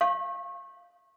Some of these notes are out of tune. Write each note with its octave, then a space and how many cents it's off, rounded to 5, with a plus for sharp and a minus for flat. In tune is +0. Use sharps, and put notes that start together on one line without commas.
F5 +0 C#6 -30